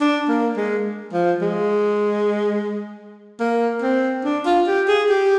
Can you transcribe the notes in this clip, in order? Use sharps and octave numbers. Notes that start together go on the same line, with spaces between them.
D4
A#3
G#3
F3
G#3
A#3
C4
D4
F4
G4
G#4
G4